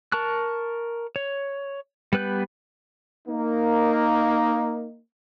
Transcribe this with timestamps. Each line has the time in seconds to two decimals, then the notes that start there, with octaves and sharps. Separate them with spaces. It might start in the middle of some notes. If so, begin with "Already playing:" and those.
0.12 A#4 A5 C#6 F#6
1.16 C#5
2.13 G3 B3 B4 F#6 G6
3.27 A#3 D#4